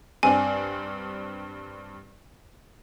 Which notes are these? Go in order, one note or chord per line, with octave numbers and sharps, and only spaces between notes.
G2 C4 D4 G#5